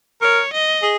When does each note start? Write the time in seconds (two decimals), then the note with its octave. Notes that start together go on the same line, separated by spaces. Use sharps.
0.22 A#4 C#5
0.53 D#5
0.83 G#4